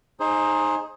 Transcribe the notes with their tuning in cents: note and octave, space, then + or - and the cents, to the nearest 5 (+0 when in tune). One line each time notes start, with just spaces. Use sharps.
D#4 +0 G#4 +5 C5 +25